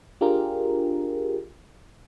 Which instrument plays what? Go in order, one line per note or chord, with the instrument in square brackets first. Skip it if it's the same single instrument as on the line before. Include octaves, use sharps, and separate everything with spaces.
[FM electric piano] D4 F4 G4 G#4 A#4